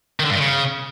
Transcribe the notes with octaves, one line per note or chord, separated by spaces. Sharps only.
D#3
D3
G2
D#3
C#3